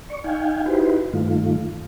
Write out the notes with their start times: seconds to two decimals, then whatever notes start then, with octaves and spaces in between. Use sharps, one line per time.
0.10 D5 C#6
0.24 D#4 F5 G5 G#5
0.66 D#4 E4 F#4 G4 B4 C5
1.13 G2 D#3 A3 F4